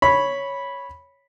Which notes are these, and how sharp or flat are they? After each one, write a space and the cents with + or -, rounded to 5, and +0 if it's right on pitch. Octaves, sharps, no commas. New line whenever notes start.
C#5 +0 B5 -5